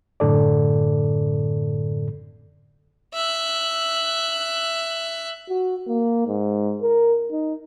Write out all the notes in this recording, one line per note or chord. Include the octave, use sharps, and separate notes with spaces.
F#2 A2 D3 A4 D5
E5 F#6
F#4
A#3
G#2
A#4
D#4